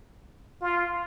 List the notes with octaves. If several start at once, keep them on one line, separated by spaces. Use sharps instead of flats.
F4